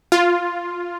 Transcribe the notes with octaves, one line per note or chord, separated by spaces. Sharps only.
F4